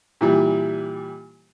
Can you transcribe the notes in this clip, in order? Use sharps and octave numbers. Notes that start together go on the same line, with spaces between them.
A#2 E3 G3